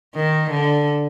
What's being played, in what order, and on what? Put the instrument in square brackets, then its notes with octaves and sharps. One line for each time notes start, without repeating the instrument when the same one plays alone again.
[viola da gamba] D#3
D3